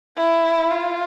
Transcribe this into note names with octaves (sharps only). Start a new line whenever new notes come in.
E4
F4